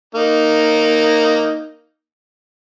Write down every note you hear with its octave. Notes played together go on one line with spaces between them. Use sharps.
A#3 D#4